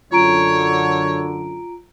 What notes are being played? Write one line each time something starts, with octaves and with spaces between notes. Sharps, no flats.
F#2 D3 F4 C#5 A#5 D7